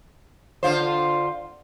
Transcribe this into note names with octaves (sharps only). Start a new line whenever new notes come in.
D3 F4 C5